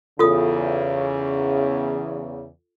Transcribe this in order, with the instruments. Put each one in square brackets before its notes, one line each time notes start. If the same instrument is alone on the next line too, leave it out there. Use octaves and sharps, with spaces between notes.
[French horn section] E2 C#3 [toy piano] F4 A4 D#6